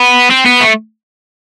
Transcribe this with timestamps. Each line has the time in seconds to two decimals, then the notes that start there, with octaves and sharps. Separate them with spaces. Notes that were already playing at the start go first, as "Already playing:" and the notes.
Already playing: B3
0.31 C4
0.46 B3
0.61 A3